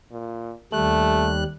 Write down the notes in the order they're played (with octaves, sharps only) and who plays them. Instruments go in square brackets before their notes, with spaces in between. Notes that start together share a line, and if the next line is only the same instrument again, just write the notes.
[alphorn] A#2
[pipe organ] D#2 G3 F#6 [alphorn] A3